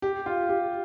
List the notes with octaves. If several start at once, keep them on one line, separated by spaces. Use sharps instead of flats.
G4
F4
G4